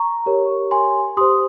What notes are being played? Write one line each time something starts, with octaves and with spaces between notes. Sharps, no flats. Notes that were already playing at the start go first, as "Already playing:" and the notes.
Already playing: A#5 C#6
G4 A#4 C#5
G#5 C6
G4 C5 C6 D#6